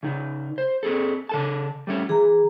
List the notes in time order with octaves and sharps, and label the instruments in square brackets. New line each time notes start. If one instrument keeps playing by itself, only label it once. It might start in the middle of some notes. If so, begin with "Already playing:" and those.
[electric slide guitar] C#3 D#4
C5
C4 G#4 A4
C#3 A4 A5
G3 A3 C#4
[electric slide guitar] E3 [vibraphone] G#4 A#5